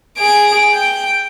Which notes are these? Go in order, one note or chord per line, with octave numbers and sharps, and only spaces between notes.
G#4 D7
G5